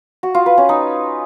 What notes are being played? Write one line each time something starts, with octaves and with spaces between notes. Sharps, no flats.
F#4
F4
B4
C#4
D#4